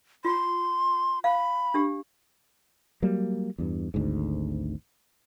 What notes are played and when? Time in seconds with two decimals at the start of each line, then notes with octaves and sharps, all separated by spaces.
0.25 F4 C6
1.24 F5 B5
1.74 D4 G4
3.02 F#3 G3 A#3
3.58 E2 G2
3.94 G#1 D2 G#2